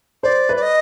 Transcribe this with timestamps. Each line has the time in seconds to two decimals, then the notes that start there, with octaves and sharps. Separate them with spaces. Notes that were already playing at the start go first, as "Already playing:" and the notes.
0.23 C5 D5
0.49 B4
0.57 D5
0.62 D#5